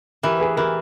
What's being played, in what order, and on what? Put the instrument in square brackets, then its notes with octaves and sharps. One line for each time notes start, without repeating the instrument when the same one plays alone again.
[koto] E3 [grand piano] G4 A#4
[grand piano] G#4 B4
[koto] E3 [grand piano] G4 A#4